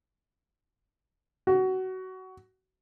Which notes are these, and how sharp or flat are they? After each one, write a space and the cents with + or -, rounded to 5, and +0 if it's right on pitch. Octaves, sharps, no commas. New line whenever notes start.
F#4 +20